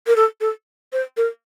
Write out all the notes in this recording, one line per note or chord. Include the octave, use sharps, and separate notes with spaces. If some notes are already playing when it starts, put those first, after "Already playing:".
A#4
A4
A4
C5
A#4